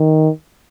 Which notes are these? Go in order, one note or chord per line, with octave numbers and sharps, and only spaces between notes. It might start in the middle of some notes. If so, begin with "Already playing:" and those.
Already playing: D#3